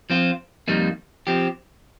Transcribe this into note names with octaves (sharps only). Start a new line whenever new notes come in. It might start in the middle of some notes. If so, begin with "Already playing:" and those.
F3 C4 F4
F2 D#3 G3 A#3 D#4
F3 C4 G4